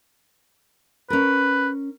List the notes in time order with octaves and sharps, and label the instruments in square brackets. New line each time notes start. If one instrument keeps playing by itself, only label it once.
[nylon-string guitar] C#4 A#4 [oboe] B4